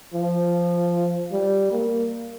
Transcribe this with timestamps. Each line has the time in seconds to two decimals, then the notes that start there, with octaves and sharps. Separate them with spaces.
0.14 F3
1.32 G3
1.71 A#3